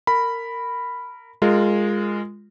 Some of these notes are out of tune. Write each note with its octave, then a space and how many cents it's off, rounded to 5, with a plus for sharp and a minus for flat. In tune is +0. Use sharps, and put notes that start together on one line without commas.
A#4 -20 B5 +0
G#3 -10 F4 +0 A#4 -25